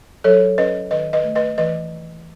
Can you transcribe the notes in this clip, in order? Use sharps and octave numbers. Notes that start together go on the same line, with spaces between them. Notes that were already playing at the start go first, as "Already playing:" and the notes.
F#3 A4 C#5
C#4 B4 D#5
D#3 B4 D#5
B4 D#5
A3
B4 D#5
E3 B4 D#5